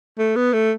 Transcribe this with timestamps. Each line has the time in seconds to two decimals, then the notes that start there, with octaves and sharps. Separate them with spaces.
0.18 A3
0.36 B3
0.53 A3